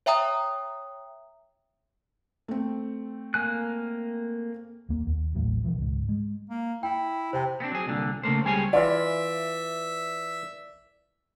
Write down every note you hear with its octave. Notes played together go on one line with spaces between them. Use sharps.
C#5 E5 G5 A#5 D#6
A3 C4
A#3 G#5 F#6
D#2 A#3
D#2
A1 D#2 A2 F#3
B2 E3 F3
C#2 G#2
G#3
A#3
E4 G5
C3 C5 G5
B3 C4 D4
F#3 G#4
C2 A#2 D3
C#3 A3 A#3 C5
C#2 G3 G#4 C5 C#5 G#5
E3 F4 D5 E5